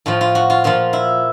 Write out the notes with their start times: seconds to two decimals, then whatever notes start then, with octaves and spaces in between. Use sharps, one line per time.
0.06 A2 F3 F4
0.21 F4
0.35 F#4
0.50 F4
0.64 A#2 F3 F4
0.93 E4